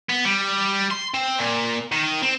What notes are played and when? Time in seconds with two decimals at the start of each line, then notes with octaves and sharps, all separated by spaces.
0.09 B3
0.25 G3
0.91 C6
1.14 C4
1.39 A#2
1.92 D#3
2.23 C4